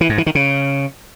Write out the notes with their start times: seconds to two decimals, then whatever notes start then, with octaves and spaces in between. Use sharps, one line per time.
0.01 E3
0.09 G#2
0.18 E3
0.26 D#3
0.35 C#3